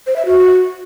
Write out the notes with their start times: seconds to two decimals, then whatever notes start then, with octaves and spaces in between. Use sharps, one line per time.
0.07 C5
0.16 E5
0.26 F#4